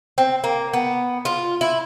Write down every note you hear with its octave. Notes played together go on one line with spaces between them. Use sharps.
C4
A#3
B3
F4
E4